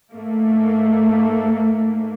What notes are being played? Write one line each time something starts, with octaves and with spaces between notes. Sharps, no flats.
G#2 A3 A#3